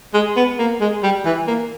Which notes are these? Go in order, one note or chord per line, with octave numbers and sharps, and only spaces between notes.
G#3
B3
A#3
G#3
G3
E3
A#3